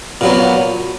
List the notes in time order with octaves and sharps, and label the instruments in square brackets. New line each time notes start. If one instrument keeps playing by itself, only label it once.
[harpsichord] A#2 F#3 B3